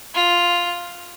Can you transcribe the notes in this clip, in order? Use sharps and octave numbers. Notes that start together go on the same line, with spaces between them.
F4